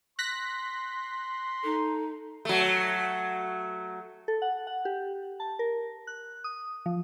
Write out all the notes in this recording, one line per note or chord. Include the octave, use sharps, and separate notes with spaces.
C6 F#6 A#6 B6
D#4 A4
F#3 A3
A4
F#5
F#5
G4
A5
A#4
F#6
D#6
F3